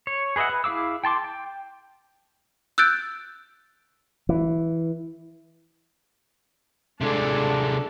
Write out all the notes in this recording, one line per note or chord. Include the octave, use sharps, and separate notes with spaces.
C#5
G#4 B4 D#5 E5 F#5
B4
E4 G#4 F5 D6 E6
G5 A5 C6 D6
G5
E6 F#6 G6 A6 D7
E3
C3 G#3 D4 A4